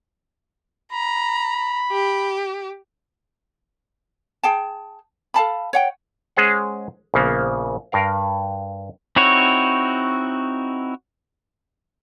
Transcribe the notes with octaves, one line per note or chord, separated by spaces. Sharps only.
A#5 B5
G4
G#4 G5 A5
A4 F5 A5 B5
C#5 F#5 G5
G#3 C#4 G#4 C5 F#5
A#1 C#3 A#3 B3
G2 A#4 F5
C4 D#4 E4 F#4 C#5